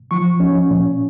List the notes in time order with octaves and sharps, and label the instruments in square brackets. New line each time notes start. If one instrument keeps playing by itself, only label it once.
[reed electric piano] F3 C#6
C#4
A#2